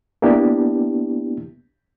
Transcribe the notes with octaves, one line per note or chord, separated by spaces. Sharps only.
A#3 B3 D4 E4 G4